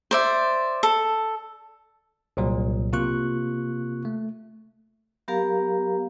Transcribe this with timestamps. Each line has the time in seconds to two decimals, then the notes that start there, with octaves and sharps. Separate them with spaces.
0.11 C5 D5 E5
0.83 A4
2.37 C2 A#2 F#3
2.93 C3 A#3 F4 C#6 F#6
4.05 A3
5.28 F#3 B3 G4 A#4 F5 A#5